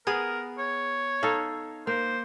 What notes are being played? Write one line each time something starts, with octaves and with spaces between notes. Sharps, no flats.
B3 G#4 A#4
C#5
D#4 A4 F5
A#3 C5